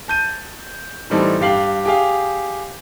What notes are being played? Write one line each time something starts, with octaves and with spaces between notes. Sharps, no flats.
A5 G6 D#7
A2 E3 G3 C4 D#4 A4
G2 G4 F5 C7 F#7
G4 G#4 F5